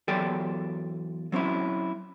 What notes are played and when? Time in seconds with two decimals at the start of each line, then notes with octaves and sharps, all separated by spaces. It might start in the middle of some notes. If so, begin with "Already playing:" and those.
0.08 E2 F#3 G4 A4 D5 G5
1.32 F#3 C4 C#4 E4